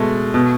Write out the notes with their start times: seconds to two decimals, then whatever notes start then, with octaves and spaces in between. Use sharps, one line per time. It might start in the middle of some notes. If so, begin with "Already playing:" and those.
Already playing: B2 G#3 A3
0.34 B2